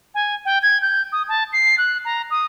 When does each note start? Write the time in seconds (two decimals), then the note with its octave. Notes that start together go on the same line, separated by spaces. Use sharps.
0.15 G#5
0.45 G5
0.63 G#6
0.82 G6
1.12 D#6
1.29 A5
1.53 C7
1.78 F#6
2.05 A#5
2.31 D#6